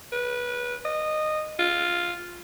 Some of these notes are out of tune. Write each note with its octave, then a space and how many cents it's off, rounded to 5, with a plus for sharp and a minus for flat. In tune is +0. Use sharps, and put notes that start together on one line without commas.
B4 -20
D#5 -15
F4 +0